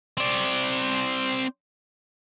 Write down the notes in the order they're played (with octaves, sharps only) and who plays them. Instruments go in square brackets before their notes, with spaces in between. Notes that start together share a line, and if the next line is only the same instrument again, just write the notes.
[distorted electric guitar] C4 D5